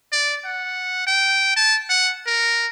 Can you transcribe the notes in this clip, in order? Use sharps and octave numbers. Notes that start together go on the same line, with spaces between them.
D5
F#5
G5
A5
F#5
A#4